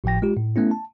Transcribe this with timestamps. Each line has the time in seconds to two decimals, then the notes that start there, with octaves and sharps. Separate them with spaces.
0.04 G#1 A2 F3 G5 A#6
0.22 G#3 F4 G4
0.37 A2
0.56 A3 B3 C#4 E4
0.71 A5